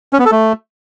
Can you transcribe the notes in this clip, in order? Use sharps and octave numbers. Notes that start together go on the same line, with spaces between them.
C#4
B3
A4
A3